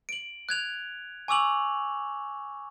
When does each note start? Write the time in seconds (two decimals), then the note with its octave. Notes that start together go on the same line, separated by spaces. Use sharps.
0.09 D7 F#7
0.49 F#6 G#6 F7
1.28 G#5 C#6 D6 E6 F7 F#7